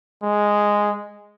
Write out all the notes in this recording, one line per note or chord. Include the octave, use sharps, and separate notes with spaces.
G#3